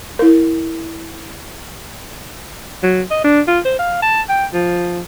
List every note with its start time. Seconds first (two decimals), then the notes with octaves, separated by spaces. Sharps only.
0.19 E4 A#4
2.83 F#3
3.11 D#5
3.24 D4
3.47 F4
3.65 C5
3.79 F5
4.02 A5
4.29 G5
4.53 F3